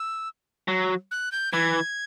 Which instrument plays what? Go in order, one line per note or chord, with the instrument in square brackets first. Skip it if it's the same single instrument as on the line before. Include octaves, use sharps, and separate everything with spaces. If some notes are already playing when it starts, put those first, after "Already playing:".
Already playing: [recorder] E6
[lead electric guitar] F#3
[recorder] F#6
G6
[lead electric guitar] E3 [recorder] G#6